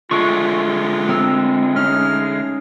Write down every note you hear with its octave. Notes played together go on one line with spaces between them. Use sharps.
D3 G#3 A3 F4 C#6
C4 A#4 E6
C#4 D#4 F6